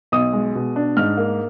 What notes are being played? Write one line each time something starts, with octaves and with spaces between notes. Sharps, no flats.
B1 D#6
G#3
B2
D4
G#2 F6
A#3